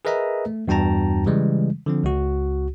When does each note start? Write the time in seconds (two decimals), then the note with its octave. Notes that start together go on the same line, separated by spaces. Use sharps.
0.05 G#4 A#4 B4 D#5 E5 A#5
0.46 A3
0.68 E2 G2 F#4 G5 A5 A#5
1.26 C#3 E3 G3 G#3
1.86 D3 F3 C4
2.04 C#2 F#4